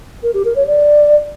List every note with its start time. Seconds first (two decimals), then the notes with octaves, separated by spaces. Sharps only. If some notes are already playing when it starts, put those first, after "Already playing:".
0.23 A#4
0.34 G4
0.45 A#4
0.56 C#5
0.67 D5